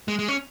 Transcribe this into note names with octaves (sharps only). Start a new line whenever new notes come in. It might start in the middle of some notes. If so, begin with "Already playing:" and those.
G#3
G#3
C#4